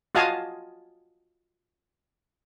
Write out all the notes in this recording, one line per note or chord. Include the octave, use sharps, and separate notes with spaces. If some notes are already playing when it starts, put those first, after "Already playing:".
F4 F#4 D#5 F5 G#5 A5